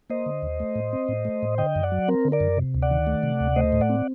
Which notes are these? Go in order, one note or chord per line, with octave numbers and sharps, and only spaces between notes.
A#3 C5 D#5
D3
D#2
A3
A2
C4
A2
A3
A2
D3 D#5 G5
F#2
D5 F#5
F#3
C4 A#4
D3
A#4 D5
F#2
C3
D2
D5 F#5
D#3
A3
C3
D2
A3 C5 D#5
A2
D5 F#5
C4